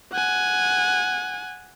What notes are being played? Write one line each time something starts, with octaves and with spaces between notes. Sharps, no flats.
F#5 G#5